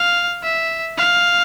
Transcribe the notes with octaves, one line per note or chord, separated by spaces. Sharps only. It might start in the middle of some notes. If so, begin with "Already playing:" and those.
Already playing: F5
E5
F5